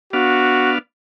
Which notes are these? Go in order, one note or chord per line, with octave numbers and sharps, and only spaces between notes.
B3 D4 F#4 F5